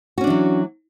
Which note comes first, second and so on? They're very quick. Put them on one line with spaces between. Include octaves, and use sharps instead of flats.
F#4 C#4 D4 E3 F#3